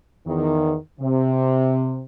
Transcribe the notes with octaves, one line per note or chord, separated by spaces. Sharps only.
E2 D#3
C3